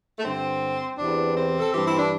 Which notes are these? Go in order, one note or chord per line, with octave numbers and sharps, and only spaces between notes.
A3
G2 D3 C4
E2 C3 E3 D4
C4
A4
G2 E3 G4
E4
D4